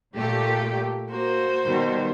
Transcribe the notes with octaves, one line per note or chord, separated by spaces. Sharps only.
A#2 A3 G4
A#3 F#4 C5
B2 D#3 G3